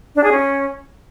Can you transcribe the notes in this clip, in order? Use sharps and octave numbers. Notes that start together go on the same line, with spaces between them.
D4
G#4
C#4